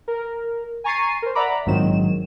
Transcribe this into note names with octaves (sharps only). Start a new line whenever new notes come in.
A#4
G#5 A#5 C#6 A6 C7 D#7
A#4 C5
D5 E5 F#5 A#5 B5 D6
A#1 G#2 D#3 F#3 C4 E7